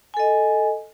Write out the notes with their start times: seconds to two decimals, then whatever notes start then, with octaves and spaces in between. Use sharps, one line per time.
0.14 G#5
0.17 A4
0.20 D#5